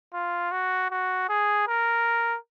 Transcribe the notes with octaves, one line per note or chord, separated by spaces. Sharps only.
F4
F#4
F#4
G#4
A#4